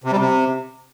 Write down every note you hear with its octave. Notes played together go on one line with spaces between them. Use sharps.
C3
G3
C3